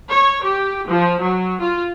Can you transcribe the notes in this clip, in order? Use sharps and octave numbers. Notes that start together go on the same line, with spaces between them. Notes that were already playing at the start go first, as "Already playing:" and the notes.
C#5
G4
F3
F#3
F4